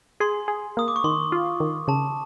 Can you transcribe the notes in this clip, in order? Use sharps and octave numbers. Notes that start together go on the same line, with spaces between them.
G#4 C6
G#4
A#3 D#6
D6
C#6
D#3 C6
F4
D#3
C#3 A5